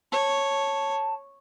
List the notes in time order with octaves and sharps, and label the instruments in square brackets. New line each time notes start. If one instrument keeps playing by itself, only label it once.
[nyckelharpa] C#5 [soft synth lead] A5